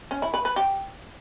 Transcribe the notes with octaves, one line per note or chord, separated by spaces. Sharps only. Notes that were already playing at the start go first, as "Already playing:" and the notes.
C#4
E4
B4
B4
G4